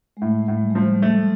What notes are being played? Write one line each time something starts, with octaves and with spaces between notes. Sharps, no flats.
G#3
A2 A3
G#3
A2
G3
G#3
F3 G3
G3
A3